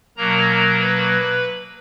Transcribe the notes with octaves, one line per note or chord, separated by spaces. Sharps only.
B2 F#3 A#3 A#4 A#5
B4 B5